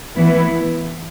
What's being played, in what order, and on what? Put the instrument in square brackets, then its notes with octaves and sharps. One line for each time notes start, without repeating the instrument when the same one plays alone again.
[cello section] E3 B3 E4